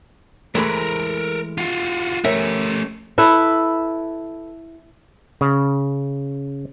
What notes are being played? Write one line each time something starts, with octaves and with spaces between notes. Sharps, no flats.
E3 G#3 A3 A#4 B4
F4 F#4
A3 C#4 G4 A#4 E5
E4 A4 B4 E5
C#3